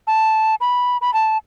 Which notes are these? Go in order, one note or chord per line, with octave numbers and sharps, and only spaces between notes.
A5
B5
B5
A5